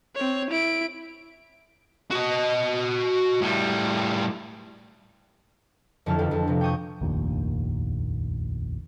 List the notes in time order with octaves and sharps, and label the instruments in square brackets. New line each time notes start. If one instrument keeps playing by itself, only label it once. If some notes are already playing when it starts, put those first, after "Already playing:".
[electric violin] C4 C#5
E4 D7
[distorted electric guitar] F#4 D#5
A2 G3
[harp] F2 D3 F#3 E4 A5 F6
E1 D4 G4
F2
C3 F3
G5 C#6 D#6 G6
[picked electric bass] F1 A#1 D#2 A#2